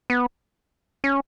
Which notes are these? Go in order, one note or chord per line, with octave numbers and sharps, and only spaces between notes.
B3
C#4